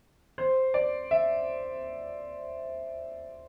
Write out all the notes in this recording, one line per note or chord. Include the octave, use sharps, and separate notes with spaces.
C5
D5
E5